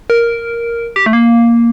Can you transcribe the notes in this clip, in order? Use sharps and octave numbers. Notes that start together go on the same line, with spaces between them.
A#4
G4
A3
A#3